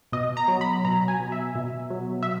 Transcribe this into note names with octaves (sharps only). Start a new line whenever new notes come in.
B2 D#5
A#5
F#3
B5
B2 A#5
G#5
B2
E5
B2
F#3
E5